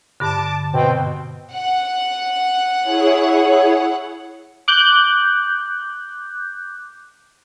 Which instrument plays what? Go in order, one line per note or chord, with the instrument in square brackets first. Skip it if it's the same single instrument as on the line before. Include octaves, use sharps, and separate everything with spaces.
[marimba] G2 D3 [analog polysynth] A5 D6
[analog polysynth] B2 C4 G5
[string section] F#5
[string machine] E4 G#4 C#5
[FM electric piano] D6 F#6 G6